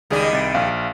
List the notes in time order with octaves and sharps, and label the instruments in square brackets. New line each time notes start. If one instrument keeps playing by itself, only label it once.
[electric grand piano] C#2 G#4 D5 [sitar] D#3 G3 D#4
[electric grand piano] C2 A6 D7
A#1 F5